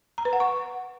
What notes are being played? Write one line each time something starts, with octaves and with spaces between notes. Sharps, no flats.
A#5
B4
F#5
C#6